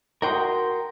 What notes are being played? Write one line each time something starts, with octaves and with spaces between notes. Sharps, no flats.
F#4 A#4 G5 C6 D#6